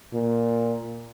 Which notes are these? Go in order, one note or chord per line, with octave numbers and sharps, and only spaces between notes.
A#2